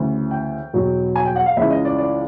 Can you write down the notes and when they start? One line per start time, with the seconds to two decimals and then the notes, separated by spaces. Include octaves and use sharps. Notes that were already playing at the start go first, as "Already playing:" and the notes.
Already playing: D2 C#3 E3
0.31 G5
0.73 E2 B2 F#3
1.16 G#5
1.25 G5
1.36 F#5
1.46 F5
1.57 C#2 C#3 E3 E5
1.70 D#5
1.85 D5
1.98 D5